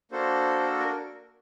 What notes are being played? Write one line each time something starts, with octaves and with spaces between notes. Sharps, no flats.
A#3 D4 F#4 A4 C5
A4
A#4
A#4